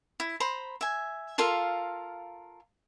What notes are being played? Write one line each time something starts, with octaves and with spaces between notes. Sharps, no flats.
E4
C5 A#5 B5
E5 G#5
F4 A4 A#4 F5